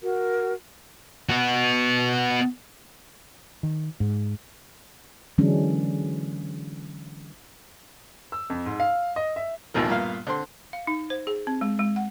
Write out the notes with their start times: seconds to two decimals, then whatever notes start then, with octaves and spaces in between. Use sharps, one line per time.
0.03 F#4 A#4
1.29 B3 F#4
3.63 D#3
4.00 G#2
5.38 D3 E3 F#3 G#3 C#4 D4
8.32 E6
8.50 F2
8.66 G#2
8.80 F5
9.16 D#5
9.36 E5
9.74 A1 D#2 B2 D#3 F3
9.88 G2 A#2 A#3 B3 F5
10.27 D3 C4 C6
10.73 F5
10.87 D#4
11.10 C5
11.27 G#4
11.47 C4
11.61 G#3
11.79 G#3
11.96 F#5